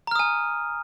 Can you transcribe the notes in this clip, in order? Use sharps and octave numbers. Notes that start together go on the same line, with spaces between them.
G#5 A#5 D#6 F6